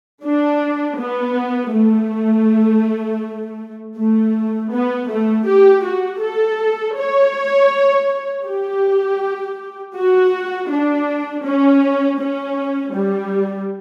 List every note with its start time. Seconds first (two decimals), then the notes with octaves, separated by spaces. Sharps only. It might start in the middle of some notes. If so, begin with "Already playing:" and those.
0.24 D4
0.99 B3
1.73 A3
3.97 A3
4.71 B3
5.10 A3
5.47 G4
5.84 F#4
6.21 A4
6.97 C#5
8.46 G4
9.96 F#4
10.70 D4
11.45 C#4
12.20 C#4
12.94 G3